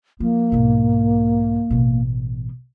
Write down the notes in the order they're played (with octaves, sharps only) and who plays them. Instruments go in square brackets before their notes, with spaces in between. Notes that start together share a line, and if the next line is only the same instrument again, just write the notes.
[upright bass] F3 [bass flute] A#3
[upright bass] B1 G#2
A1 B2